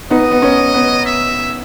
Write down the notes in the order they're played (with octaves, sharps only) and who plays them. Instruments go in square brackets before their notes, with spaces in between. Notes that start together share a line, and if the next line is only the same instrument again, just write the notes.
[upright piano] B3 D#4 [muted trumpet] D#5
[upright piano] B3
C#4
B3
[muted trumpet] E5